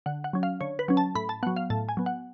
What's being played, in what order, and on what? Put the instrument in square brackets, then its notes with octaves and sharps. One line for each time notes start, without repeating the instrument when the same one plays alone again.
[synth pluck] D3 F#5
F#5
F#3 C#4
F5
D3 C#5
B4
F#3 C#4
A5
A2 B5
A5
F#3 B3 F#5
F5
A2 A5
G#5
F#3 B3
F#5